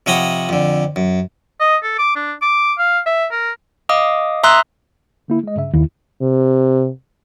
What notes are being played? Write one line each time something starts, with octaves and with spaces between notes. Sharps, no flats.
C3 F3 C#5 D#5 F#5 B5
F2 D3
F#2
D#5
A4
D6
D4
D6
F5
E5
A#4
D#5 F5 D6 D#6
E5 A#5 C6 D#6 E6 F#6
D3 A#3 E4
G#3 D#5
G2 C#3 E5
D#2 E4
C3